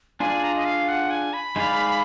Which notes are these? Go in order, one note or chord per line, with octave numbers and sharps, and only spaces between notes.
D4 F4 G#4 D5 G#5
A#5
D#5
F5
F#5
G#5
B5
G#3 D#4 G#4 D5 F5